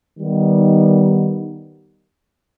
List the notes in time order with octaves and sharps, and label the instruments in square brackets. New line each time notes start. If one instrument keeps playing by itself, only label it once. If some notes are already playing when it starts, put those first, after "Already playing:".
[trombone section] D#3 G3 B3 D#4